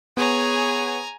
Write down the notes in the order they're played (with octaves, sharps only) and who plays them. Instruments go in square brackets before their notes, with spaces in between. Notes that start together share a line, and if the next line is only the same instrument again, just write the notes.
[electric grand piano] B3 [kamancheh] G#4 C#5 [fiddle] G#5 A#5